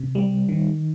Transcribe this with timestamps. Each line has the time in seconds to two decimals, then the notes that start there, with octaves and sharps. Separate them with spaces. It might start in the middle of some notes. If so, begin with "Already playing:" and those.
Already playing: C3
0.15 G3
0.49 D#3